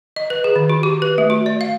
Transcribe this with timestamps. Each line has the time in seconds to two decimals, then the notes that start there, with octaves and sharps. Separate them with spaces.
0.16 D#5
0.30 B4
0.44 G#4
0.56 D#3
0.70 F#4
0.83 G4
1.02 B4
1.18 A3
1.30 F#4
1.46 D5
1.61 F5